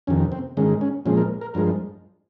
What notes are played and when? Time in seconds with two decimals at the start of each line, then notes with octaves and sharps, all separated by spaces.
0.07 F2 C3 D#3 C#4
0.32 C4
0.57 G#2 D#3 G#3 C#4
0.81 C#4
1.06 A#2 F3 G#3 C#4
1.17 A#4
1.41 A#4
1.54 G2 F3 G#3 A#4